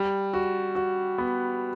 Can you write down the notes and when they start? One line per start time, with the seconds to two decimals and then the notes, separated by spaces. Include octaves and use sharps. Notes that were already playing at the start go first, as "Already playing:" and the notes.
Already playing: G3
0.33 F#4
0.75 F#4
1.18 B3